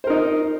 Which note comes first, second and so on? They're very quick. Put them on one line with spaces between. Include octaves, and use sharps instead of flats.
C5 A#4 D#4